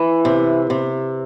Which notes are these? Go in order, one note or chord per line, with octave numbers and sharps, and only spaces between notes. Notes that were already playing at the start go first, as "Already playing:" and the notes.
Already playing: E3
C3
C3